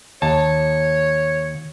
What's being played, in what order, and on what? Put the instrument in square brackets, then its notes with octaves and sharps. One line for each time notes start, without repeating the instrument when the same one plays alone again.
[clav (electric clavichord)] D#2 A5 [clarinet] C#5